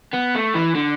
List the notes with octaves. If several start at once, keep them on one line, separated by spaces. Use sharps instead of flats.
B3
A3
E3
D3